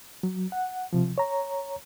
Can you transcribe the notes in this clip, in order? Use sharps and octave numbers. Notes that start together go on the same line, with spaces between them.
F#3
F#5
C3 F3
C#5 A#5